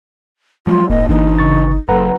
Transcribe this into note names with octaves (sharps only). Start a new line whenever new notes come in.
F3 F#3 G#3 F4
D#1 G#1 A#3 D#5
G1 E3 D4 D#4
C#3 C#6 A6
F#1 F#2 A4 B4 F#5 A#5